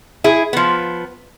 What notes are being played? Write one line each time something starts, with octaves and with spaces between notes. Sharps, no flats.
E4 G#4
F3 B3